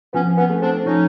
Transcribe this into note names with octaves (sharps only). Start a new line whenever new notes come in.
F3 B3 C#4
B3 C#4
A3
C4 D4
F3 C#4 D#4